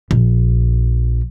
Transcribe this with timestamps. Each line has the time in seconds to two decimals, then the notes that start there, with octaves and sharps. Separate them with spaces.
0.11 A#1